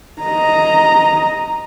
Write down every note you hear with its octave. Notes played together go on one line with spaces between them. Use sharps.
D#5 A#5